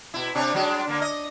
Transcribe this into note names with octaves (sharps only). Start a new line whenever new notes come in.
B2 E4
C3 D4 C#5
F#3 G#3 D4
D3 A#3
D#5